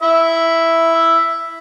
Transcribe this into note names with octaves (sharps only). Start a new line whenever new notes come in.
E4 E5